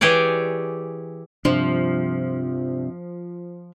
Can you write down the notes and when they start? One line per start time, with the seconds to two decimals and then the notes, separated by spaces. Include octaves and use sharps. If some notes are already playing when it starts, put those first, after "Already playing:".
0.01 E3 G4 G#4 C#5 D5
1.45 G2 C3 F3 D4